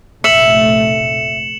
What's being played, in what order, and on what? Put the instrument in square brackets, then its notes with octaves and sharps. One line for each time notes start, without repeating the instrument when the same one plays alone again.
[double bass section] F1 A#2 A3 [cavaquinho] E5 [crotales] C#7 E7 F#7